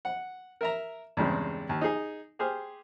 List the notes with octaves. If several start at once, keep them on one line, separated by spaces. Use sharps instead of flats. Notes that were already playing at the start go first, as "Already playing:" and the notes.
F#5
A#4 E5 A#5
E2 G2 C#3 G#3 C4
D#2
D#4 G#4
G4 G#4 C5 F6